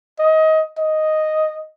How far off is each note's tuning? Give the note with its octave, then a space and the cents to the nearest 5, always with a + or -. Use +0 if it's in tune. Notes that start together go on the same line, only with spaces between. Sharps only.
D#5 +25
D#5 +0